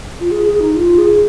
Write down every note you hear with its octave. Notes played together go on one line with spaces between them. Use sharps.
F4
G#4
G#4
D#4
F4
G#4